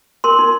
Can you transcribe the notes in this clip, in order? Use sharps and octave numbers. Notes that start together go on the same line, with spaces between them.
A#4 C6
D#4